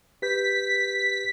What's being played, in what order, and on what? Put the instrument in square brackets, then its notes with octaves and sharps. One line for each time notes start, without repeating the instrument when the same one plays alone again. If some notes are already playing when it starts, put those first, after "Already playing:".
[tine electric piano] G4 B4 G6 [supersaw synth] B6